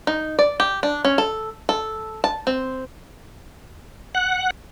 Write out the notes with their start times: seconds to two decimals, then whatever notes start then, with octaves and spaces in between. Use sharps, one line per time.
0.07 D#4
0.39 D5
0.60 G4
0.83 D4
1.05 C#4
1.18 A4
1.69 A4
2.24 A5
2.47 C4
4.15 F#5